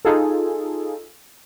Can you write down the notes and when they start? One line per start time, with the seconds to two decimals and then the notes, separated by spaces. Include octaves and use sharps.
0.05 D#4 F4 G#4 A4